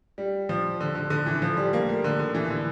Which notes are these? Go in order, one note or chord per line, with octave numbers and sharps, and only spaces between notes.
G3
F3
D3
D3
D3
E3
F3
G3
A#3
A3
D3
D3
E3
D3